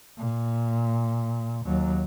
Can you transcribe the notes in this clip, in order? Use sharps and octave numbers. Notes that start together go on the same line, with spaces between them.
A#2
D#2 F#3